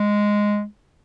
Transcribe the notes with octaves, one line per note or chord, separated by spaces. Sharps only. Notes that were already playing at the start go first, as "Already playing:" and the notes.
Already playing: G#3